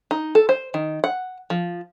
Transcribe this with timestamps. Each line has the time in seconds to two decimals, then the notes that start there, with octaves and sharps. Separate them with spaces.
0.11 D#4
0.35 A4
0.49 C5
0.74 D#3
1.04 F#5
1.50 F3